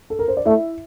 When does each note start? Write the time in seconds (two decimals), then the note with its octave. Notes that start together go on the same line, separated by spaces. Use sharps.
0.10 A4
0.19 A#4
0.28 C5
0.37 D5
0.45 A3 E4 E5